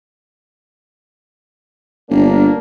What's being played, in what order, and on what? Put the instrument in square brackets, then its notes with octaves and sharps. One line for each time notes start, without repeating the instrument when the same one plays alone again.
[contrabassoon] G1 [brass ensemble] A#3 D4